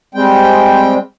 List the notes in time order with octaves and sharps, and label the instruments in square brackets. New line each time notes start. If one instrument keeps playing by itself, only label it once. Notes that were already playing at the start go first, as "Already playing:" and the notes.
[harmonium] G3 G#3 C4 G5